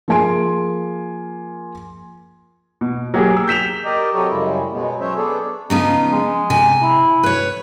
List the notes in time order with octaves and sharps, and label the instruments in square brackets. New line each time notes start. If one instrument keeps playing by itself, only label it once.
[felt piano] F3 A#3 G#4 G#5 C6 D7
[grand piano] B2
F#3 A#3 G4 G#4
E6
G6 B6 E7 F7
[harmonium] G4 A#4 D5 D#5
C3 F#3 G4 A4 C#5 D#5
F#2 C#3 G3 G#3 E4
B2 F#3 G#3 B3
F#3 C#4 C5 C#5 E5
B3 D4 G#4 A4
[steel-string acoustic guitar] C#3 F3 B3 [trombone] D#4
[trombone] G#3
[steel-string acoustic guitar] C3 G#5
[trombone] E4
[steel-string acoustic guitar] B4 C#5